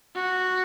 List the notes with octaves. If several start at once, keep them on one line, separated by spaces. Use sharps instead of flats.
F#4